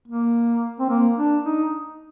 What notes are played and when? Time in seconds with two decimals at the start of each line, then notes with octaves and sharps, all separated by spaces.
0.08 A#3
0.80 C4
0.90 A#3
1.17 D4
1.43 D#4